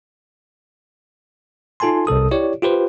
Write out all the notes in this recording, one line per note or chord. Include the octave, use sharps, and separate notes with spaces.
D#4 F4 A4 G#5 A5 C6
C2 C3 A4 D#6
E4 G4 C#5 D5
F4 G4 B4 C5